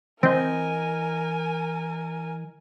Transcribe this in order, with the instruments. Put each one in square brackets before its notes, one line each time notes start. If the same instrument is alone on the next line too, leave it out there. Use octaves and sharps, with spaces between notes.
[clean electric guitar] E3 D#5 [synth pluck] C4 [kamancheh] A#4 G#5